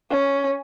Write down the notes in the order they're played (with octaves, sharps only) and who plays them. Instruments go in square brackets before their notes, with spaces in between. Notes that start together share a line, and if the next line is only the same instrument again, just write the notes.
[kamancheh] C#4